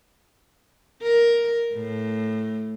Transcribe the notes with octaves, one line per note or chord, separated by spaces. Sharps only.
A#4
A2